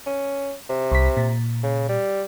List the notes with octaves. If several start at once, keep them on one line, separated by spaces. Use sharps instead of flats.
C#4
C3
C2 B6
A#2
C#3
G3